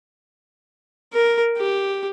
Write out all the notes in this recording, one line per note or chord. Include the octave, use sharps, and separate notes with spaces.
A#4
G4